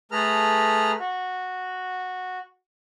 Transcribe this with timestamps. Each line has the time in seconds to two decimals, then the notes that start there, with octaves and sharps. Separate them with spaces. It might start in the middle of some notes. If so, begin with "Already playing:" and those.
0.12 A3 G#4 A4 B4 A#5 F6
1.00 F#4